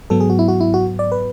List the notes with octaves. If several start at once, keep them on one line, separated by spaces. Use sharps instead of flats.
G#2 F#3 B3 A4
G#4
F#4
E4
F#4
E4
F#4
D5
B4